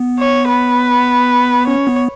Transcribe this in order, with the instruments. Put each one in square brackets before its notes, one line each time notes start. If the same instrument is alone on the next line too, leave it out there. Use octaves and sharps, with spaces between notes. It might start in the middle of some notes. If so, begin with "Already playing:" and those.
Already playing: [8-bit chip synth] B3
[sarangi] C#5
B4
[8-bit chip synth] C#4 [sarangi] C#5
[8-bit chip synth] B3